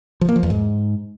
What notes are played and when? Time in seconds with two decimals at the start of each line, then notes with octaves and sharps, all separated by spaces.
0.21 F3
0.29 A#3
0.36 F3
0.43 E2
0.50 G#2